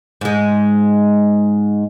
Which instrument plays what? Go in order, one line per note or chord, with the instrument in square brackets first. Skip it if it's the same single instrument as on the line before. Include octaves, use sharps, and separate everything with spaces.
[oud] G#2 G#3